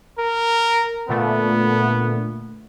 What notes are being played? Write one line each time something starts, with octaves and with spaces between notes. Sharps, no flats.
A#4
A#2 D3 A3 B3